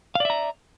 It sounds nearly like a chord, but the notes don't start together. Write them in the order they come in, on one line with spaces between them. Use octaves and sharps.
F5 D5 E5 A#5